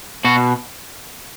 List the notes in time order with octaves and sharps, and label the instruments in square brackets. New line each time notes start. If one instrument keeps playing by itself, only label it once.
[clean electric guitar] B2 F#4